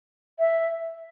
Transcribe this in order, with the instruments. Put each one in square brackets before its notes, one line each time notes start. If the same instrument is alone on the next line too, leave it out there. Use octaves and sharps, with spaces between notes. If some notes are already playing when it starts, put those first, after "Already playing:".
[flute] E5